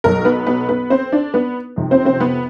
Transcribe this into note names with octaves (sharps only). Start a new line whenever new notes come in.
B1 B2 F#3 A#4
B3 B4
B3 B4
B3 B4
C4 C5
D4 D5
B3 B4
F2 C3 D#3
C4 C5
C4 C5
B3 B4